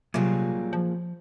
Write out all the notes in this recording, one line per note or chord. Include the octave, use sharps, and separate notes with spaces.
C3 F#3 G3 A#3 F4 G#4
F3